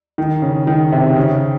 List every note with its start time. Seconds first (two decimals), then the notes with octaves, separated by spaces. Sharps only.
0.18 D#3
0.42 C#3
0.67 D#3
0.92 C3
1.16 C#3